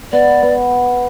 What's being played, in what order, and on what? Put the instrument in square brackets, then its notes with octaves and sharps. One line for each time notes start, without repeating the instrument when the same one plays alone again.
[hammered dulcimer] B3 [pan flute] D5
[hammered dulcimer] B3